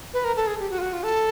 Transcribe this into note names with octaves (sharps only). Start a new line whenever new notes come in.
B4
A#4
A4
G#4
G4
F#4
F4
F#4
F4
A4